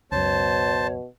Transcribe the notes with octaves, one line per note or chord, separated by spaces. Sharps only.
C#2 F#2 B2 C5 C#5 A5